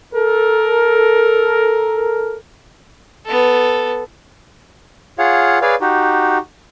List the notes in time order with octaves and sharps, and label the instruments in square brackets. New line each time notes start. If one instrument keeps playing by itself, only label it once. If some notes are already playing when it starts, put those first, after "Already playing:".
[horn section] A4 A#4
[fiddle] B3 A4
[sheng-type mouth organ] F4 G#4 C#5 F5 F#5
G#4 B4 C#5 D5 F5
D#4 F#4 G4